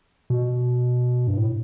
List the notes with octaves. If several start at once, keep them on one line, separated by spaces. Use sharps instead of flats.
B2
G2
A2